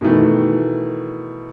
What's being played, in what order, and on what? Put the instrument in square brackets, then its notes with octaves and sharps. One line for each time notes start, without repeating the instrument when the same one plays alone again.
[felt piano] B2 D#3 E3 A3